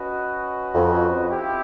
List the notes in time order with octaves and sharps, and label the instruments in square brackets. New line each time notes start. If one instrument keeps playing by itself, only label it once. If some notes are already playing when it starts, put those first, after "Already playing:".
Already playing: [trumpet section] C#4 F#4 B4 D#5
[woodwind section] F2
[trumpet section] C4 E4 G4